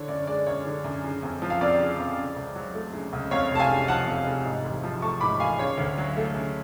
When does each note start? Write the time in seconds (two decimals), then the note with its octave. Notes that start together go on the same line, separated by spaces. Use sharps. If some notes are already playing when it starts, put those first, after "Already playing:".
Already playing: D3 C#5
0.08 F#2 D5
0.27 G#3 D5
0.47 F#2 C#5
0.66 D3
0.84 F#2
1.04 C#3
1.23 F2
1.42 F3
1.50 F5
1.61 F2 D5
1.79 C#3
1.99 F2
2.18 C#3
2.36 C#2
2.55 F#3
2.74 A3
2.93 C#3
3.13 C#2
3.31 F2 C#5 F5
3.51 F1 A5
3.59 F5 G#5
3.70 C#3
3.88 F3 F#5 A5
4.08 F2
4.26 F1
4.45 G#2
4.64 A1
4.83 F3
5.02 A3 A5 C#6
5.21 G#2 B5 D6
5.40 A1 F5 G#5
5.59 C#3 C#5 F5
5.78 D2
5.98 F#3
6.17 A3
6.35 C#3